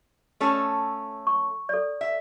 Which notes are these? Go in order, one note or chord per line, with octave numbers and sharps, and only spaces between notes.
A3 C#4 A4
C#6
A4 D5
E5